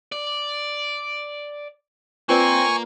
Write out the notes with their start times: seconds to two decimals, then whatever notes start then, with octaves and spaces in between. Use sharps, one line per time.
0.12 D5
2.29 A#3 C4 F4 B4 D5 G#5 C#6